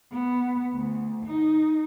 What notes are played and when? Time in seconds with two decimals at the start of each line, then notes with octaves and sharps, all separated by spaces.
0.12 B3
0.74 D2
1.26 D#4